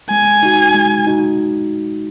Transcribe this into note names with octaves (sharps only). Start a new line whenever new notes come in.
G#3 G#5
D#4 F#4
G#3
D#4 F#4